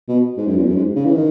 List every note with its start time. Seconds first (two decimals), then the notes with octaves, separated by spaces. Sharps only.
0.08 B2
0.37 G#2
0.47 F#2
0.57 E2
0.66 F#2
0.76 G#2
0.95 C#3
1.05 E3
1.15 D#3